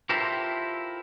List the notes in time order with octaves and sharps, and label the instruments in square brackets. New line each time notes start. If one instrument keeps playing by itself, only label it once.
[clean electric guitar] E4 F4 G4 A4 A#4 C5